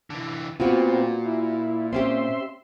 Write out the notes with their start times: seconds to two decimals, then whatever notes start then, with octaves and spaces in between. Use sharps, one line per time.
0.10 D3 E3
0.60 A#2 B3 C4 F4 F#4
1.26 E4
1.93 C4 C#4 G4 E5 C6